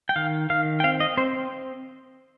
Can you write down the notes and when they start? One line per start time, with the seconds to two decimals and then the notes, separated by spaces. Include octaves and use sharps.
0.09 G5
0.16 D#3 F5
0.50 D#3 F5
0.80 G5
0.84 C4 F5
1.00 D#5
1.17 C4 C5